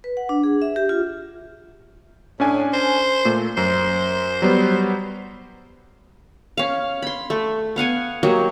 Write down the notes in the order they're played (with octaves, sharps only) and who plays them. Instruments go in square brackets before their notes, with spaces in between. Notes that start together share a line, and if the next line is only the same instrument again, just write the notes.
[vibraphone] B4
F#5
D4
G#4
E5
G4
F4
[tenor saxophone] A2 [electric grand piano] C#4 D4 G#5
[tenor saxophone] C5
[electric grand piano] A#2 A3
[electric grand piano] F#2 [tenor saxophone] C5
[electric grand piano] F#3 G3 B3
[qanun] C#4 F5
B5 C6
A3
B3 F5 F#5 G#5
F#3 A#3 G4 D#5